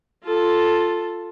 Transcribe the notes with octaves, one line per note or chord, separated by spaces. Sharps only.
F4 A4